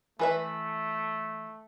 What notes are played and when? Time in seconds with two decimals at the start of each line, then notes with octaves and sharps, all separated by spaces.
0.19 E3 A3 B4 E5